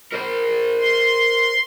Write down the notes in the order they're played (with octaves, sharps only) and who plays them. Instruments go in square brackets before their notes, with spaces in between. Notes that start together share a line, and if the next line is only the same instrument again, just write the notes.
[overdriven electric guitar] A#4 C5
[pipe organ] C6